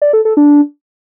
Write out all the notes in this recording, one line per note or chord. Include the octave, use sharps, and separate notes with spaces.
D5
A4
A4
D4